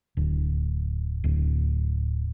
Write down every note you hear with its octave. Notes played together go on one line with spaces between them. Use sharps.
D1
D1